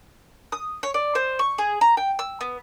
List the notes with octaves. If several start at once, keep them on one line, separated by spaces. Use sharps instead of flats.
D#6
C#5
D5
C5
C#6
G#4
A#5
G5
E6
B3